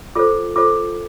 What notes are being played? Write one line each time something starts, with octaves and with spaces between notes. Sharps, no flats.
F4 A4 C5 D6
F4 A4 C5 D6